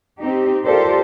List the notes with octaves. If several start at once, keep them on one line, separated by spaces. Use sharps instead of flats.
C4 D#4 G4
F4 G4 A4 A#4 C5 D5